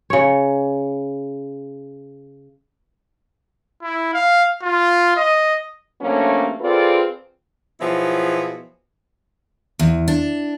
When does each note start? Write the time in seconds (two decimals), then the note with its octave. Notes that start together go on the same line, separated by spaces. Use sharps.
0.10 C#3 C#5
3.82 E4
4.14 F5
4.62 F4
5.17 D#5
6.02 C3 F#3 A3 A#3 C#4 D4
6.61 C4 F4 G#4 A4 B4 D5
7.80 B2 F3 F#3 E4 G#4
9.79 E2
10.08 D4